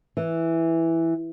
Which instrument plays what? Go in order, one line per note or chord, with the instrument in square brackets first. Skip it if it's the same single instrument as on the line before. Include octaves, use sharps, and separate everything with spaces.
[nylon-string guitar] E3